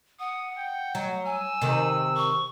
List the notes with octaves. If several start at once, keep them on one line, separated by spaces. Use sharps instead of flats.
F#5 D#6
G5
F#3
G#5 E6
C3 D#3
C#6